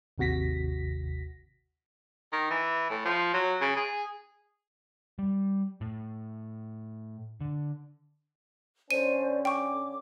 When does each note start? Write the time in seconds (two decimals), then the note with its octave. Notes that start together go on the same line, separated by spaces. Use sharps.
0.18 G#1 D#2 C3 F#4 A#6 B6
2.33 D#3
2.50 E3
2.90 A2
3.05 F3
3.34 F#3
3.61 C#3
3.76 G#4
5.19 G3
5.81 A2
7.41 D3
8.91 D3 C#4 C5 D5 G#5 D#7
9.45 G5 C#6 D6